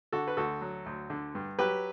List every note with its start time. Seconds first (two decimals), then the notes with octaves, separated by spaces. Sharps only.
0.12 D3 F#4 A4
0.27 B4
0.37 D2 F#4 A4
0.61 F#3
0.86 D2
1.10 D3
1.35 G2
1.59 F#3 G4 B4